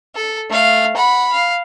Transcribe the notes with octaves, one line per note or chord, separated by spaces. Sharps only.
A4
A3 F5
F#5 B5
F5